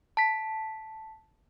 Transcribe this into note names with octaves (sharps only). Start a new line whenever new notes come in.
A5 B6